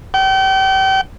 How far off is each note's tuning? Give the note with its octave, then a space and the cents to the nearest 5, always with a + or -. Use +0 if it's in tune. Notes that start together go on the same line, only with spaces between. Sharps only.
G5 -35